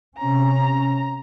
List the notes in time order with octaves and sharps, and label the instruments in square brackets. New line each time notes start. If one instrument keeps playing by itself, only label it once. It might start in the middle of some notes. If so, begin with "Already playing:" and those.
[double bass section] C3 C#4 [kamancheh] A#5